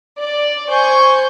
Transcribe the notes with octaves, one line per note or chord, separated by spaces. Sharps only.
D5
C5 G#5 C#6 G6